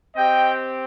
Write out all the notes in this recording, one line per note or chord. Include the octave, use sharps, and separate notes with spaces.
C4 G4 D#5 G5